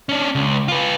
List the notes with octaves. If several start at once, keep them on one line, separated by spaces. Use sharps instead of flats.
C#4 D4
C#2
F4 B4